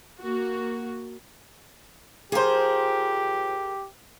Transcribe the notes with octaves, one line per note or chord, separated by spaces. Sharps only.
A#3 F#4
F3 G4 G#4 A#4 C5